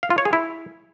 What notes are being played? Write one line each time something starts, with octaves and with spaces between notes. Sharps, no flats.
F5
F4
C#5
G#4
E4